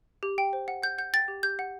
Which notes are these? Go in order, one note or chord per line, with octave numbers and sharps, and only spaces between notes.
G4
G5
C5
F#5
F#5 G6
F#5 G6
G5 A6
G4
G4 G6
F#5